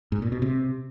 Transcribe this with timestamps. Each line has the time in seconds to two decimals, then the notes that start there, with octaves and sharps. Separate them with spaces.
0.12 G#2
0.22 A#2
0.32 B2
0.42 C3